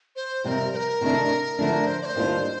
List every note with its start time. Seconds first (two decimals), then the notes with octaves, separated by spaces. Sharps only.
0.16 C5
0.44 F2 C3 G3 A#4 C5
0.73 C5
0.76 A#4
1.01 C3 D#3 A3 D4
1.59 D3 F3 A3 D4
1.87 C5
2.02 D5
2.05 C5
2.16 D#2 D#3 G3 D4 F4